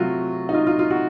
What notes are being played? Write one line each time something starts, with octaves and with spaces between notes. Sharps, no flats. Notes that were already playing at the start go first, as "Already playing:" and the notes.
Already playing: C3 F#3 A3 F4 F#4
D#4
F4
F4
F4
F#4